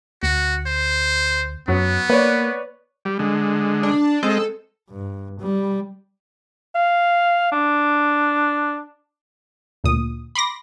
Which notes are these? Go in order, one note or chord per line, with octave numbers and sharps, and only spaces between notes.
D2 F#4
C5
F#2 F#3 B3
A#3 B4 C#5 D5
G3
D3 G#3
D4
G#3 C4 A4 D#5
G2
G3
F5
D4
D2 A#2 D#6
B5 C6 D6 A#6